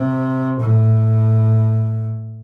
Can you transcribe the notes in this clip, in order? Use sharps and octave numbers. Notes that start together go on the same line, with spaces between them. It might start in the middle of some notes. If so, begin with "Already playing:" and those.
Already playing: C3
A2